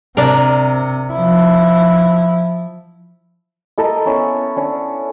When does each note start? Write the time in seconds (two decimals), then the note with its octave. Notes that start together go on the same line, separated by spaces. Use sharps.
0.17 C3 D4 A#4
1.12 F3 E4
3.78 E4 A4 A#4 D#5
4.05 B3 C#4 E4 C#5
4.56 C#4 D4